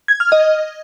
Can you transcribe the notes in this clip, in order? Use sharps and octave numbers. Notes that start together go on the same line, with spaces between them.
G#6
F6
D#5